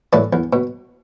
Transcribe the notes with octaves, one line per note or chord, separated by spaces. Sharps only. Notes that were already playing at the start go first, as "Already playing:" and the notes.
A2 E3 D5
E2
B2